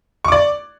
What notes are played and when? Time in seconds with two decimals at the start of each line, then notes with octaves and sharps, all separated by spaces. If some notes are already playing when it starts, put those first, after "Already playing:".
0.25 C#6
0.28 D6
0.32 D5